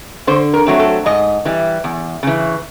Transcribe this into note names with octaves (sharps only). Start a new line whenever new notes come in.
D3 C5
A#4
F#3 A3 C4
A4
G#2 D#5
E3 G3
E2
C#3 E3